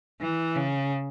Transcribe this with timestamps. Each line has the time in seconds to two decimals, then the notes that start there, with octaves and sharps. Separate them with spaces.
0.21 E3
0.56 C#3